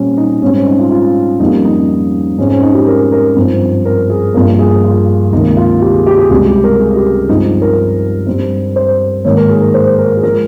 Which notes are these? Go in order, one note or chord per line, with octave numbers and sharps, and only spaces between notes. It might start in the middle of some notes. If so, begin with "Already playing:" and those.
Already playing: A#2 G3 C4 C#4
D#4
G#2 G3 C4 C#4
C#4
D#4
F4
F4
F2 C#3 G3 A#3 D#4
D#4
G#2 F3 G#3 C4 C#4
C#4
D#4
G4
A#4
A#4
G2 F3 C4
A#4
G#4
G2 F3 A#3 A#4
G#4
F4
C#2 C3 D#3 A#3 D#4
F4
G4
G#4
G4
G#4
C#2 C3 G3 G4
G4
A#4
G#4
G4
G2 F3 G#3 C4 D#4
D#4
A#4
G2 G3 C4
C5
G#2 D#3 A#3 C#5
A#4
G#4
A#4
C5
A#4
G#4
F3 G#3 A#4